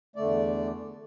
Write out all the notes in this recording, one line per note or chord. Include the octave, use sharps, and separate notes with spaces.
E2 D3 A3 D5